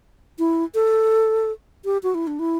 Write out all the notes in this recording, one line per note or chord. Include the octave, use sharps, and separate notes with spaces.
E4
A4
G4
F#4
E4
D4
E4